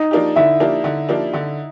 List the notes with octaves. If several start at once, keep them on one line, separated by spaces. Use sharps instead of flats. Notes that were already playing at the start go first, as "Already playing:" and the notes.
Already playing: D#4 D#5
F3 A#3 D4 G4
D3 E4 E5
F3 A#3 D4 G4
D3
F3 A#3 D4 G4
D3